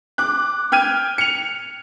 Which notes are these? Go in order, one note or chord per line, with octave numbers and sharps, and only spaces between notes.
D6 F#6
G5 F6 G#6 D#7
C#7 F7